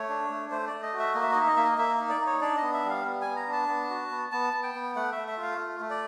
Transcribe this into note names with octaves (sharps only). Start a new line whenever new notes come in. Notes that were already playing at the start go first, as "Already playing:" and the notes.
Already playing: A3 C#5
D4
A3
A3 C5
D5
A3
D#5
F#4
E5
A#3 D#5
E5
D#5
D#4 E5
D#5
A#3 E5
D#5
A#3 E5
D#4
D5
D#4
C#5
D4 D5
B3 D#5
E5
G3 F5
B3
B3 G#5
A#5
D4
A5
B3
F#4
B3
B3 A5
B3
G5
B3
A3 F#5
A3 E5
E5
F4
F5
A3
A3
D5